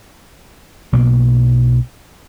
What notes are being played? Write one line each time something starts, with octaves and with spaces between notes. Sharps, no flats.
B1 B2 A#3